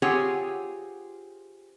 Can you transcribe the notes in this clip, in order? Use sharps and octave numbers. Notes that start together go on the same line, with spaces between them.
C4 F4 G4 G#4 C#5 F#5